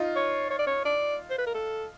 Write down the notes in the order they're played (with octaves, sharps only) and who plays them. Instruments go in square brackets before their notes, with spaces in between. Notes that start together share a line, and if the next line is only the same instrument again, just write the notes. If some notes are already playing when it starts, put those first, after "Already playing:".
Already playing: [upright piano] D#4 F4
[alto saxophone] C#5
C#5
D5
C#5
D5
C5
B4
A#4
A4